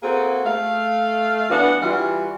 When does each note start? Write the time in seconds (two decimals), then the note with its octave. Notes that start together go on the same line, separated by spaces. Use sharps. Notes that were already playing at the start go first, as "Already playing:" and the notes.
0.03 A#3 C4 F#4 G#4 A4
0.45 A3 F5
1.50 E3 B3 D4 F#4 F#5
1.82 E3 G3 F4 F#4